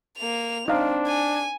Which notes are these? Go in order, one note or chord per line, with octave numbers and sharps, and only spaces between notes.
A#3 F7
C4 D4 D#4 F5
G#5